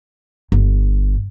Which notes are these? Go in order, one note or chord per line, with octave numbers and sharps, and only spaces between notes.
G1